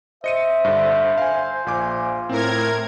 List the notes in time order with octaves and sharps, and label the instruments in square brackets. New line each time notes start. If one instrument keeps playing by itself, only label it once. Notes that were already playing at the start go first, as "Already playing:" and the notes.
[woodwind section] C5 [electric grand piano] D#5 C#7 D#7 [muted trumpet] E5
[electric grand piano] G2 D3
F5 G#5
[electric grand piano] A#1 G#5 D6 [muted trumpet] F4
[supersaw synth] A2 A#4 G#6 [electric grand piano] C4